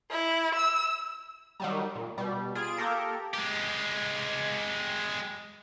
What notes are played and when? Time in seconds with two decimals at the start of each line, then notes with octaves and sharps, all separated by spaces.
0.11 E4
0.54 E6
1.60 D#3 F#3 G3
1.95 A#2
2.18 B2 G3
2.55 F4 G#4 D7 E7
2.78 A#3 G4 A4 A#4
3.34 G#3 G4